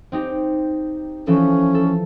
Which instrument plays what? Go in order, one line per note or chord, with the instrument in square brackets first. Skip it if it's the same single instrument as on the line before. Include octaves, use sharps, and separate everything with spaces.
[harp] C4 D#4 G4
[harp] E3 F3 A4 [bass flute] C#4
[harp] A4